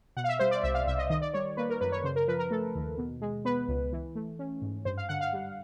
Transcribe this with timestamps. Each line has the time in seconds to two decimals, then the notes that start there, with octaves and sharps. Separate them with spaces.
0.17 B2 F#5
0.24 F5
0.29 E5
0.39 G3 C5
0.51 D5
0.63 C2 E5
0.75 F5
0.87 C2 E5
0.98 D#5
1.10 D#3 D#5
1.22 D5
1.34 G3 C#5
1.57 A#3 B4
1.70 A#4
1.81 F#2 B4
1.92 C#5
2.04 C#3 C5
2.16 A#4
2.28 F3 B4
2.39 A#4
2.51 A3 A4
2.75 D#2
2.98 B2
3.21 G#3
3.45 B3 B4
3.68 C#2
3.93 E3
4.15 A3
4.39 C#4
4.62 G#2
4.85 G2 C5
4.97 F5
5.09 D3 F#5
5.21 F5
5.33 G3